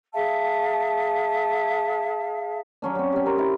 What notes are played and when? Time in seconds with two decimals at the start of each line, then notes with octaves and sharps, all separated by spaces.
0.13 G#4 E5 F5 A5
2.82 F#3 C#4 D4
2.95 F#3 C4
3.12 C#4 G4
3.26 A#4 C5
3.38 E4 A#4